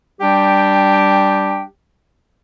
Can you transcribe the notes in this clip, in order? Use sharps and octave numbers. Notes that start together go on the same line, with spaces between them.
G3 D4 G4 G5